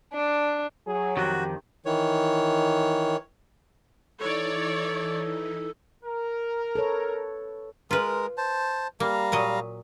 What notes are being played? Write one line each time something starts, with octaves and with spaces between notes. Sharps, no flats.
D4
F#3 G#4
F2 D#3 F#4 G4
D#3 E3 C#5
E3 D#4 E4 A4 C#5 D5
A#4
A4 B4 C#5
G#3 F4 A#4 B4
C5 A5
G3 A#3 F5 A#5
A#2 F#3 D#5